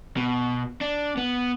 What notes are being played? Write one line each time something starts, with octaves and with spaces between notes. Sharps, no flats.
B2
D4
B3